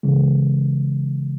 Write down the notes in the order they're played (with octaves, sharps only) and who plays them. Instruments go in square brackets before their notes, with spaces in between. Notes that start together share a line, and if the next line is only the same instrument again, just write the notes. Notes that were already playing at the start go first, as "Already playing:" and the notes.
[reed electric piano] C#3 E3 G#3